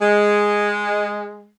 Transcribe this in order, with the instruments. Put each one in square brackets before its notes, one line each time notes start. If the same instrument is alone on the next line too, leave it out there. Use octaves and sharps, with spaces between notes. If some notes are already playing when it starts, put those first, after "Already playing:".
[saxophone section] G#3